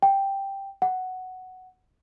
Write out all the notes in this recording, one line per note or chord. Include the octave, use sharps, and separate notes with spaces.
G5
F#5